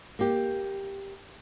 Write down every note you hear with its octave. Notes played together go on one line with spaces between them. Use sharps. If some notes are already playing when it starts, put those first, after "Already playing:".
A#3 G4